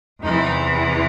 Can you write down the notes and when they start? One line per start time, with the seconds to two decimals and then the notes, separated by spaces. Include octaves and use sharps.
0.22 E2 C3 E3 D#4